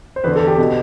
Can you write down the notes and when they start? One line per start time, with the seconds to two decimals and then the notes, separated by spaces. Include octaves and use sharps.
0.16 C5
0.24 E2 D3 B4
0.36 A4
0.47 G4
0.58 B2